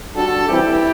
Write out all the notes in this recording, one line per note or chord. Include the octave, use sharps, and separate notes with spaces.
D3 G3 D4 F#4 A4
E3 G3 C4 E4 G4